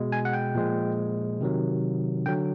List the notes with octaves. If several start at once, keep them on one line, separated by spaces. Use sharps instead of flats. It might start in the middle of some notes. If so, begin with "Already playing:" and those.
Already playing: B2 G#3
G#5
F#5
G5
A#2 F3 G#3
C3 D#3 F#3
D3 F#3 G5